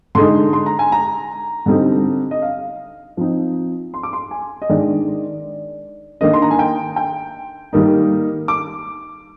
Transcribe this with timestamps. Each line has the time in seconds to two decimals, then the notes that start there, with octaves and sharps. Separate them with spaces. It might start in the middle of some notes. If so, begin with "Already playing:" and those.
0.15 D3 G#3 D#4 C6
0.53 C6
0.66 A#5
0.79 G#5
0.92 A#5
1.66 D3 G3 C4 D#4
2.31 D#5
2.42 F5
3.17 F3 C4 D#4
3.94 C6
4.03 D6
4.13 C6
4.31 G#5
4.62 D#5
4.69 D#3 G#3 D4 D5
6.21 D#3 A#3 D4 D#5
6.33 C6
6.42 A#5
6.51 G#5
6.59 G5
6.96 G5
7.73 D#3 G3 A#3 D#4
8.48 D6